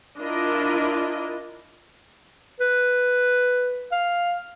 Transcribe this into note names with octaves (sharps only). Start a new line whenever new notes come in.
D4 E4 F4 A#4 D#5
B4
F5